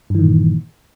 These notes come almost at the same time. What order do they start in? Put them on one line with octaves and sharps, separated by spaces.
G2 E3 D#3 A#2